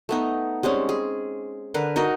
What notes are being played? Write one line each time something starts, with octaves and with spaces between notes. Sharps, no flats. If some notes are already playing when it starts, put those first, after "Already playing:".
A3 B3 D#4
G3 G#3 C4 C#4
G#4
D3 A#4 B4
D#4 F#4 A#4 D#5